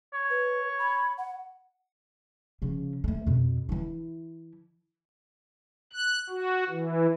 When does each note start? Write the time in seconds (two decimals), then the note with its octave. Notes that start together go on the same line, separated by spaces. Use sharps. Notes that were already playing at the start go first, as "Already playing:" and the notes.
0.14 C#5
0.30 B4
0.79 B5
1.18 F#5
2.62 C#3 F3
3.04 G#3 A3
3.27 F2 B2
3.69 E3 E4
5.93 F#6
6.30 F#4
6.69 E3